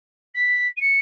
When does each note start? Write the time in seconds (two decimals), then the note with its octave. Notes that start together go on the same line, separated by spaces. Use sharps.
0.34 B6
0.76 D#7
0.80 C#7